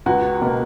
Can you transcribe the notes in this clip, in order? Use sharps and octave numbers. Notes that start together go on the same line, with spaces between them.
C#2 F#4
B2 A#3